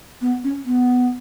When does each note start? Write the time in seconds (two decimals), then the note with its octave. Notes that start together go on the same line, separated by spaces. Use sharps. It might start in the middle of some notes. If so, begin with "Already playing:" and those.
0.21 B3
0.44 C#4
0.66 B3